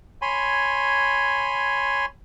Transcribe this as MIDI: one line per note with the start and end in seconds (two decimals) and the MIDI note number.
0.22 2.06 73
0.22 2.06 80
0.22 2.06 83
0.22 2.06 84